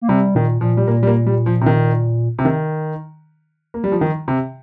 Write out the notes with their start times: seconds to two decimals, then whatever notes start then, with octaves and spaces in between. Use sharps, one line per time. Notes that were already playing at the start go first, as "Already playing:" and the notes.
0.02 A#3
0.09 C3 G3
0.35 A#2 D#3
0.61 A#2 F3
0.77 G3
0.87 A#2 A#3
1.03 G3
1.07 A#3
1.26 G3
1.46 F3
1.61 C3
1.66 D#3
2.39 C3
2.45 D#3
3.74 A#3
3.84 G3
3.92 F3
4.01 D#3
4.28 C3